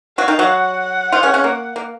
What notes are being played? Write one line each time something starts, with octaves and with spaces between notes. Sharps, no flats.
F#3 F#4 F5
D#3 D#4
F#3 F#4
F#5
F3 F4
C#3 C#4
C#3 C#4
A#3
A#3